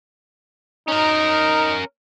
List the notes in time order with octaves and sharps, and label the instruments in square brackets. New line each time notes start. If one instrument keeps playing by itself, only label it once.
[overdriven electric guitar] C#4 A#4 [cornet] D#4